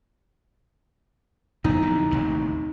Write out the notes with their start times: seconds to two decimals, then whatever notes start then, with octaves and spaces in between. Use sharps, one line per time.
1.64 F2 F#3 B3 D#4
1.82 F2 D3 E3
2.11 A1 D#2 C3